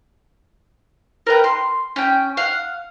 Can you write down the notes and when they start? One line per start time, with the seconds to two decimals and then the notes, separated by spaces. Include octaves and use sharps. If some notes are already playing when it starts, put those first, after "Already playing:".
1.27 A#4 B4 G5
1.44 C6
1.96 C#4 G5
2.37 F5 F#5